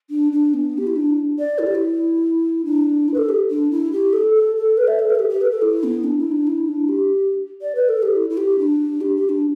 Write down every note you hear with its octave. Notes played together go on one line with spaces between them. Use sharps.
D4
D4
B3
G4
E4
D4
D5
E4
G4
E4
D4
E4
B4
A4
G4
D4
E4
G4
A4
A4
A4
B4
E5
A4
B4
A4
G4
G4
B4
A4
E4
B3
D4
E4
D4
E4
D4
G4
D5
B4
A4
G4
E4
E4
G4
D4
G4
G4
D4